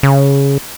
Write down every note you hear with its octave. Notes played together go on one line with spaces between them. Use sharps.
C#3